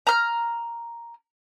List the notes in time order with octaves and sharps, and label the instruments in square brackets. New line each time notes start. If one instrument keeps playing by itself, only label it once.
[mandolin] A#5 F6